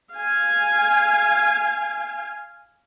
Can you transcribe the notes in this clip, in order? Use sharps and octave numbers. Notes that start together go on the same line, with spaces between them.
F5 G#5